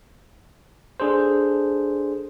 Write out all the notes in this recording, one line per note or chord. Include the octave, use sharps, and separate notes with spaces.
D4 G#4 A4 C5